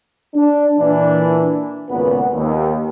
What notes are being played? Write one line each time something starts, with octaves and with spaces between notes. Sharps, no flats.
D4
A#2 E3 D4
G#1 A#2 C#3 B3 B4 F#5
D#2